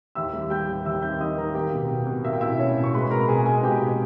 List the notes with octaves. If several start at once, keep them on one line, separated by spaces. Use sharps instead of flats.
D#2 E5 E6
G3
G3 G5 G6
D#2
D#2 E5 E6
D#3 G5 G6
D#3 D#5 D#6
D#3 A#4 A#5
A#3 G4 G5
B2
B2
B2
A#3 E5
G5
B2 E4 E5
B2 C#4 C#5
B2
C#6
G#3 B4 B5
B2 A#4 A#5
B2 G#4 G#5
G#3 G#4 G#5
B2 G4 G5
B2